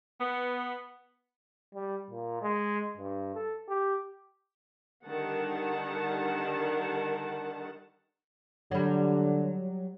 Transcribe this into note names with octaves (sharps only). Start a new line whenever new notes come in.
B3
G3
A#2
G#3
G2
A4
G4
D3 D#3 G3 F#5 A5
D3 F#3 G3